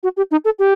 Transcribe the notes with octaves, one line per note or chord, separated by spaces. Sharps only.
F#4
G4
D#4
A4
G4